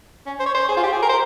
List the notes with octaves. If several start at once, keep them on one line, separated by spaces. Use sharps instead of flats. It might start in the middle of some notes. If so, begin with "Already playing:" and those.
C#4
C5
C#5
C5
G#4
F4
G4
G#4
A#4
C5